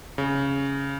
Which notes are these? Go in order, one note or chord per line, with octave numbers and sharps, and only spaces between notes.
C#3